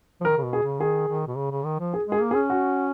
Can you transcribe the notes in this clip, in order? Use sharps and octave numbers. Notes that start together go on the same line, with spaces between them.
F3
D#3 A#4
C#3
B2
G#4
C#3
D#3 G#4
D#3
B2
C#3
C#3
D#3
F3
G#4
G#3 G#4
A#3
G#4
C#4
F#4